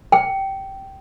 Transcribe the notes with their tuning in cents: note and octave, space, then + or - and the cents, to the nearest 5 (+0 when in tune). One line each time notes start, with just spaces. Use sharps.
G5 -15